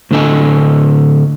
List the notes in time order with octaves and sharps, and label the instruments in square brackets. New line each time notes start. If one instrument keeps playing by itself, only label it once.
[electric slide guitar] A2 D3 D4 A4 D#5 G#5